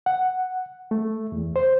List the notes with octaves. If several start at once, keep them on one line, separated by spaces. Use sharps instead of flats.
F#5
A3
E2
C5